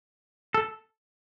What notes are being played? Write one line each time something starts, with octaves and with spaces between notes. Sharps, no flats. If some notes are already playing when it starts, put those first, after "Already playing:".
A4